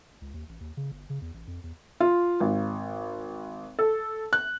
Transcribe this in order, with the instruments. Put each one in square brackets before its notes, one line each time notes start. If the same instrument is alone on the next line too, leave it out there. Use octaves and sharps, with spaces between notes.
[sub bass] C#2
D#2
A1
D#2
C#3
G1
C#3
E2
A1
F2
E2
[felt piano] F4
G#1
A4
F#6